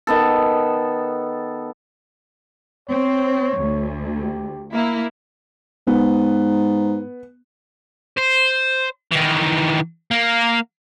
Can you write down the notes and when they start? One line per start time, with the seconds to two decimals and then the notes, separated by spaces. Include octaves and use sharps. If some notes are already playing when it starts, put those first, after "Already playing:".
0.07 D#3 B3 A4
2.90 C4 C#5
3.58 D2
4.22 G4
4.74 A#3 E4 E5
5.87 G#2 B3
8.18 C5
9.12 D#3 E3
10.11 A#3